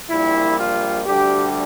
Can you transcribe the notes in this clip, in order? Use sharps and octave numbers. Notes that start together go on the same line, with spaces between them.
A#1 A#2 G3 E4
F4
D2 D3 G3 G4